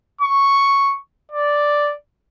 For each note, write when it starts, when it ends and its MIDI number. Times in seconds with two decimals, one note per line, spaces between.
0.21 0.95 85
1.32 1.94 74